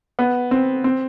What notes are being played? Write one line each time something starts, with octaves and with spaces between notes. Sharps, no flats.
B3
C4
C4